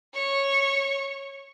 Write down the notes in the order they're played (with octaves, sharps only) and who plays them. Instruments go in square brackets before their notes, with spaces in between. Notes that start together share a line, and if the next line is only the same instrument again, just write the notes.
[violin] C#5 C#6